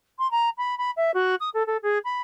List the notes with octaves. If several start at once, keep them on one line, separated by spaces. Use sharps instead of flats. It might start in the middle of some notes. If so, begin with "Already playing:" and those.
C6
A#5
B5
B5
E5
F#4
D#6
A4
A4
G#4
B5